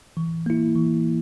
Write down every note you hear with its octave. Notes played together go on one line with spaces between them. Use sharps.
E3
A#3 E4
E3